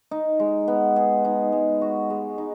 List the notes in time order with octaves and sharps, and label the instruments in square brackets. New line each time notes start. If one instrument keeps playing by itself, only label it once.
[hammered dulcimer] D#4
G#3
B3
G#4
D#4
G#3
F#4
G#3
D#4